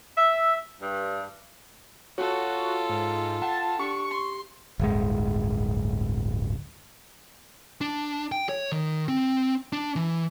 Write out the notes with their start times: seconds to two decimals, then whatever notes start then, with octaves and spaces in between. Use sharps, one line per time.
0.16 E5
0.80 G2
2.18 F4 F#4 A4 C#5
2.90 G#2
3.42 F#5 G5 A5
3.80 D4 G4 C#6
4.10 C6
4.79 D1 G1 G#3
7.81 D4
8.32 G5
8.49 C#5
8.72 D#3
9.08 C4
9.73 D4
9.96 E3